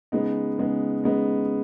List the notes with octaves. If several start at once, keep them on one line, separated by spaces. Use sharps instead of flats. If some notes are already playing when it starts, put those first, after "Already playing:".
C#3 G#3 B3 D#4
C#3 G#3 B3 D#4
C#3 G#3 B3 D#4